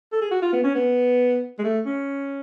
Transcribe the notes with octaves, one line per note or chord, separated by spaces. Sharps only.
A4
G#4
F#4
F4
B3
C#4
B3
G#3
A3
C#4